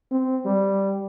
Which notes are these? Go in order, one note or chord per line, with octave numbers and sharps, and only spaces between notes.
C4
G3